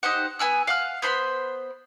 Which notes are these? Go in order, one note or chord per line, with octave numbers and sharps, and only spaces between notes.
D#4 G4 C5 F#5
B3 G#5 E6 F#6
F5 F#5 F6
B3 C5 B5 C6